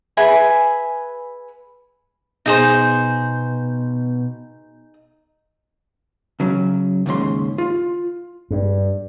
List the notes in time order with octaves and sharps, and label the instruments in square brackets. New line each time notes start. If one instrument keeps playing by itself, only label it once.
[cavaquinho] G#4 B4 E5 G#5
[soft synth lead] B2 [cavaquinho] D#4 G#4 C5
[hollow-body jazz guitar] C#3 F#3
D#2 G#2 C#3 C6
F4
[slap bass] G2